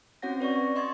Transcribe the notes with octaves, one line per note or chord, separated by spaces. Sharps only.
C4 C#4 F#4 C#5 F#5 A#6
B4 C#5 D5 C#6
C#6
D#5 C6 C#6 G#6 A6